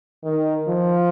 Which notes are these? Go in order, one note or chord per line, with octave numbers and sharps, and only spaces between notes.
D#3
F3